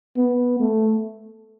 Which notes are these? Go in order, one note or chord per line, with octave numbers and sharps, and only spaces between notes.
B3
A3